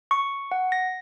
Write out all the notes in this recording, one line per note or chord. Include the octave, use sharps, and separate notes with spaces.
C#6
F#5
A#6